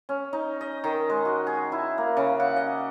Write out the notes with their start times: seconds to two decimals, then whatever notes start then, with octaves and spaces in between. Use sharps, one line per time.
0.09 C#4
0.33 D#4
0.61 D#5
0.84 D#3
1.10 G#3
1.25 F#4
1.47 G#4
1.72 E4
1.98 A#3
2.17 C#3
2.40 F#5
2.56 D#5